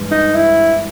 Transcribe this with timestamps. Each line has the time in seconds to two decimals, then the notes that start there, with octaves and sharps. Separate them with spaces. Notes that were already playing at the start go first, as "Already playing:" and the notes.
Already playing: G2 E3 G#3
0.11 D#4
0.35 E4